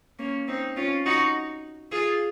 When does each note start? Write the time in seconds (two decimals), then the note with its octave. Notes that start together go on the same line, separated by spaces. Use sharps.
0.19 A#3 C#4
0.48 C4 D#4
0.77 C#4 F4
1.06 D#4 F#4
1.92 F4 G#4